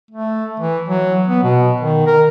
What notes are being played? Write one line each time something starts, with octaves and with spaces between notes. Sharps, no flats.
A3
E3
F#3
B3
B2
D#3
A#4